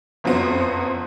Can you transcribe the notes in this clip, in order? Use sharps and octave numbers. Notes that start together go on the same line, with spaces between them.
F#1 F2 F#3 B3 C5